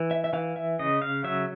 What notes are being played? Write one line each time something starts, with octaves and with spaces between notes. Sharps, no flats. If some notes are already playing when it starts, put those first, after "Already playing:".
Already playing: E3
E5
E5
E3 F5
E5
C#3 D#5
F5
F#3 E5